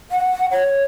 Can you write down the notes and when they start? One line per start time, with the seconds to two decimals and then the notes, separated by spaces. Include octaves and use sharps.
0.11 F#5
0.51 C#5